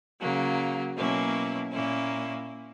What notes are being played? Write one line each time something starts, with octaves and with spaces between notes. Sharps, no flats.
C#3 F#3 A#3
B2 F#3 A#3 C#4 E4
A#2 A#3 C#4 E4